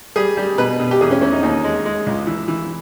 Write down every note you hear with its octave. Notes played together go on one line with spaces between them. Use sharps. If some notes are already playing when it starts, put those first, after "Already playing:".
G3 G#4
G3
B2 B4
B2
G4
E2 G#4
C#4
E2 C#4
D#4
D#2 D#4
G#3
G#3
C#2
E3
E3